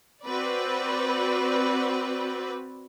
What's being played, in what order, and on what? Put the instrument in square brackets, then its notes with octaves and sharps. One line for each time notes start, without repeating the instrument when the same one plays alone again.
[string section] C4 F#4 B4 D5